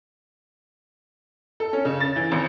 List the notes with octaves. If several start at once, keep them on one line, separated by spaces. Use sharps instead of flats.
A4
C#4
C#3
A6
E3
G#1